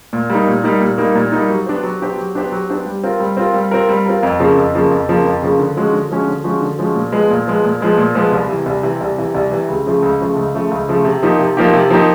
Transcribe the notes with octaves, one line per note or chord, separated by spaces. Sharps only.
A#2
G3 A#3 D#4
A#2
G3 A#3 D#4
A#2
G3 A#3 D#4
A#2
G3 A#3 D#4
F#3
B3 D4 G4 C5
F#3
B3 D4 G4 C5
F#3
B3 D4 G4 C5
F#3
B3 D4 G4 C5
G3
C4 F4 A#4
G3
C4 F4 A#4
G3
C4 F4 A#4
G3
C4 F4 A#4
F2
C#3 F3 A#3
F2
C#3 F3 A#3
F2
C#3 F3 A#3
F2
C#3 F3 A#3
D3
F3 G#3 C#4 F#4
D3
F3 G#3 C#4 F#4
D3
F3 G#3 C#4 F#4
D3
F3 G#3 C#4 F#4
A#2
F3 G#3 B3
A#2
F3 G#3 B3
A#2
F3 G#3 B3
A#2
F3 G#3 B3
C2
C3 E3
C2
C3 E3
C2
C3 E3
C2
C3 E3
C#2
C#3 F3 A3
C#2
C#3 F3 A3
C#2
C#3 F3 A3
C#2
C#3 F3 A3
C3
F3 A#3 D#4 G4
C3
F3 A#3 D#4 G4
C3
F3 A#3 D#4 G4